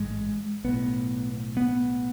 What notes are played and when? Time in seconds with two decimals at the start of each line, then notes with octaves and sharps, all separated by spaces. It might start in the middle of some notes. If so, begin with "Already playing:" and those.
Already playing: A1 G#2 G#3
0.65 B1 A2 B3
1.57 B3